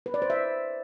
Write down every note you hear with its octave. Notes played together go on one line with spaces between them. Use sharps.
B4
D5
C5
E5